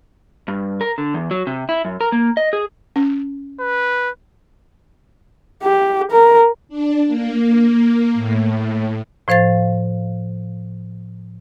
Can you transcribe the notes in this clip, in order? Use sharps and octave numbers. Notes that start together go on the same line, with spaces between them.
G2
A#4
D3
E2
F#3
C3
E4
F#2
A#4
A#3
D#5
G#4
C#4
B4
G4
A#4
D4
A#3
A2
A2 F3 C5 F5 A6